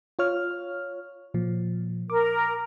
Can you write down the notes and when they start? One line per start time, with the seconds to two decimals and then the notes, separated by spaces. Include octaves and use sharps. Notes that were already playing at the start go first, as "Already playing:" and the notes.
0.19 F4 C#5 F6
1.34 A#2 F3
2.10 A#4 D6